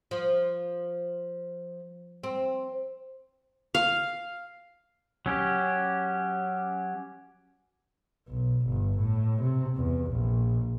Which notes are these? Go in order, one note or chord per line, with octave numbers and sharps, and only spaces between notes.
F3
C4
F5
F#3 C#4 G4
B1
G1
A2
C3
E2
A#1